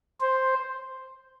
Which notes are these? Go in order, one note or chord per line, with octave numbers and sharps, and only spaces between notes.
C5